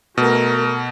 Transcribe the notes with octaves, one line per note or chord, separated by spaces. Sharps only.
B2 A3 A#4